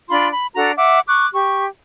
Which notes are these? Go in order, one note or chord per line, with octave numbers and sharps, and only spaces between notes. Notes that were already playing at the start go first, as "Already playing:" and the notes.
D4 F4 B5 C6
B5
D4 F#4 A4 A#5
E5 F#5 D6
C#6 D6 F#6
G4 C#6